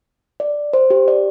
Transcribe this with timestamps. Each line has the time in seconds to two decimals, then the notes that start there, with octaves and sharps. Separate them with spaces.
0.40 D5
0.73 C5
0.90 G4
1.08 D5